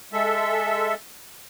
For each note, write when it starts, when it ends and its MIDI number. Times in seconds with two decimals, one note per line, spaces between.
0.13 0.95 56
0.13 0.95 69
0.13 0.95 76